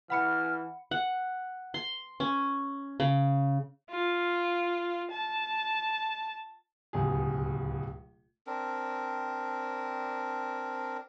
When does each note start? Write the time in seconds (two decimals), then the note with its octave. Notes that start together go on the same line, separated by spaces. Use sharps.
0.10 E3 F#5 B5 F6 C#7
0.91 F#5
1.74 C6
2.20 C#4
3.00 C#3
3.91 F4
5.12 A5
6.93 D1 C#2 B2 G4 G#4
8.47 C4 D4 A#4